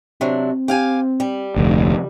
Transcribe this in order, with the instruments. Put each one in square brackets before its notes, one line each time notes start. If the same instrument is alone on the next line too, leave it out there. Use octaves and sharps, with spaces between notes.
[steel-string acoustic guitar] C3 F#3 D4 [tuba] C4
[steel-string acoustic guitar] G4 F5 G#5
G3
[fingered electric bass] F1 D2